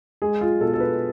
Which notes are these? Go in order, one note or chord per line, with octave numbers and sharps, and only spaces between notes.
G#3 G#4
F4
B2 A4
A4
B4